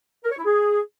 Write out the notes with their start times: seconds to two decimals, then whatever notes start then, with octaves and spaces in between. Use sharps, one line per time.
0.24 A#4
0.31 C#5
0.38 E4
0.45 G#4